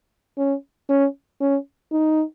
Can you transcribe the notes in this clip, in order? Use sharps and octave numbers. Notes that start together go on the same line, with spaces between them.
C#4
C#4
C#4
D#4